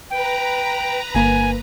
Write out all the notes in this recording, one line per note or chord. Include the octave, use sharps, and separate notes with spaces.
B4 G5 A#5
G1 A#3 G#5